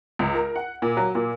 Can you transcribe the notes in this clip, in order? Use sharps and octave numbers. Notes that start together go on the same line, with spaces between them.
C#2
A#4
F#5
A#2
F#3
A#2